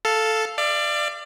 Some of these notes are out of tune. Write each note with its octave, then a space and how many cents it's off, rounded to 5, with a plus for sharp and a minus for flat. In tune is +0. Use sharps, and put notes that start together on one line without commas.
A4 +0 F5 +0
D5 +20 F5 -40